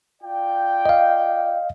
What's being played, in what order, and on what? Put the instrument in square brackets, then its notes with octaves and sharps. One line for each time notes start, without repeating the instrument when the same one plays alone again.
[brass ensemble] F4 D5 G5
[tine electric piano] D#5 F5